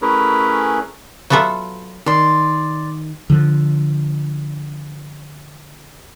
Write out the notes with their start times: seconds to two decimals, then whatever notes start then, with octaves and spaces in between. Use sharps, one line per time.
0.02 A3 C#4 E4 G#4 A#4 B4
1.30 F#3 B3 F4 A4 E5 F#5
2.06 D#3 D5 C6
3.30 D3 F3